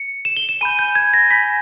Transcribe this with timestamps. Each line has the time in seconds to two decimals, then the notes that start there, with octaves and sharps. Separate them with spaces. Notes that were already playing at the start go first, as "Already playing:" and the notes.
Already playing: C#7
0.25 E7
0.37 G7
0.49 E7
0.61 G#5 B5 G6 D#7
0.79 G6
0.95 G#6
1.14 A#6
1.31 G#5 B5 G6 B6